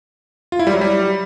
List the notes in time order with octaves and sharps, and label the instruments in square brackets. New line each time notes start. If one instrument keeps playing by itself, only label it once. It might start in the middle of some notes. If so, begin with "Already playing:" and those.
[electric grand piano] F4
E4
G3
F#3
G3